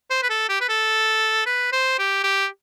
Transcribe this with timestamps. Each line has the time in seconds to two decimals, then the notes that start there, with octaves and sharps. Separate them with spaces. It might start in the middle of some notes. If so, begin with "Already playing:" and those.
0.10 C5
0.23 B4
0.30 A4
0.49 G4
0.61 B4
0.69 A4
1.46 B4
1.73 C5
1.99 G4
2.24 G4